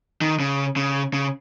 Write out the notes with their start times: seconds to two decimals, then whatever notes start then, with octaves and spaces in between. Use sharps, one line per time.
0.21 D#3
0.40 C#3
0.76 C#3
1.13 C#3